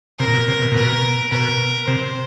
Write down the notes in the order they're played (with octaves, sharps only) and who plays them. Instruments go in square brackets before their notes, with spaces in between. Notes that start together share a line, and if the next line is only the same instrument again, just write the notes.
[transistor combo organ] C3 [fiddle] A#4
[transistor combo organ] A#2
B2
C3
B2
A#2
[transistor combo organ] B2 [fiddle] A#4
[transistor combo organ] B2 [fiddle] A#4
[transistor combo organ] C3 [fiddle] C5